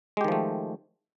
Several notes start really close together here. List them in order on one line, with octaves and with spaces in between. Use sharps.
G#3 G4 D#3 F3 A3